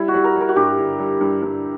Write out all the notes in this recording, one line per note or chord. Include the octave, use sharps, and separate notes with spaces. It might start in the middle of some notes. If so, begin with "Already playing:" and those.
Already playing: G3 E4
F#4
G3
A#4
G3 A#4
F#4
G2 G4
D3
G3
G2
G2